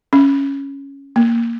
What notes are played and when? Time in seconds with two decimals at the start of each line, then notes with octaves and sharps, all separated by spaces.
0.13 C#4
1.16 A#3